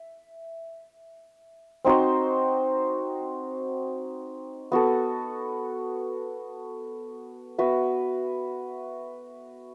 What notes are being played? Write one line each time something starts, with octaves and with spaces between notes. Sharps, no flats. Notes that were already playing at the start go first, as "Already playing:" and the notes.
Already playing: E5
C4 D#4 F#4 C5
B3 F#4 A4
B3 F#4 B4 E5